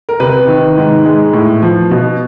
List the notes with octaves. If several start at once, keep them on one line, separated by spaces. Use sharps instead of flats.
A#4
C3 B4
D#3
G#2
G#3
A2
F3
B2